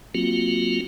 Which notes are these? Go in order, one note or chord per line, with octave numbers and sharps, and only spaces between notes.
F#3 A#3 C4 F4 F#4